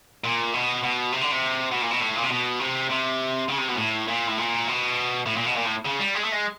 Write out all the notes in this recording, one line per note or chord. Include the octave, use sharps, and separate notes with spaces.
A#2
B2
B2
C3
D3
C3
B2
A#2
B2
A2
A#2
C3
B2
C3
C3
C#3
C3
B2
A2
A#2
A2
A#2
B2
A2
A#2
B2
A#2
A2
C#3
G3
G#3
A3
G#3